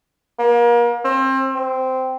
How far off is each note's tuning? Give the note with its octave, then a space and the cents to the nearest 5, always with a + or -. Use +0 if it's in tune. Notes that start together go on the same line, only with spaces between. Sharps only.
A#3 +35
C4 +30
C4 -10